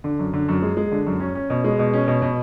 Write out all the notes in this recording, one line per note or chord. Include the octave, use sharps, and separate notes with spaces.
D3
F#2
D3
F#2
G#3
G#3
D3
F#2
C#4
C#4
B2
G#3
B2
C#4
B2
B2